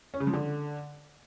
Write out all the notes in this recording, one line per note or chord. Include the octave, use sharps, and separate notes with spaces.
C#4
C#3
F3
D3